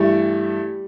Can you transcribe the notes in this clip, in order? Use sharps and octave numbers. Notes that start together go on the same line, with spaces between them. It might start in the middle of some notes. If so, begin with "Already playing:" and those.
Already playing: G2 E3 G3 A3 E4